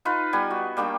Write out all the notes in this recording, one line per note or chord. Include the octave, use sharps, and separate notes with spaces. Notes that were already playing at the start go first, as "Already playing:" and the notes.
D#4 F4 B4
G3 B3 G#5
F#4
G3 A#3 D4 G5